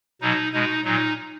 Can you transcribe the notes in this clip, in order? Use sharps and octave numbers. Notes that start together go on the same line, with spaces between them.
B2 F#3 D#4
B2 G#3 D#4
A#2 F#3 D#4